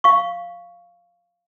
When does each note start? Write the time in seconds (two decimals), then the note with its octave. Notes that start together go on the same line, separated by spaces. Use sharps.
0.04 F5 C#6